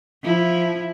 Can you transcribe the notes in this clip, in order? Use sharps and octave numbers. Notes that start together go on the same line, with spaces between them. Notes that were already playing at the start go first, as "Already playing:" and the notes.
F3 E4